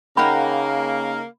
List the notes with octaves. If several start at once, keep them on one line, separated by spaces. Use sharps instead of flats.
C#3 A#3 D#4 F#5 G5 B5